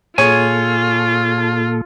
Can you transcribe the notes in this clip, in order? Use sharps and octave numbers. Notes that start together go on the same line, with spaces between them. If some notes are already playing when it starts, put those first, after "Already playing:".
A#2 F4 G#4 A4 C#5 G#5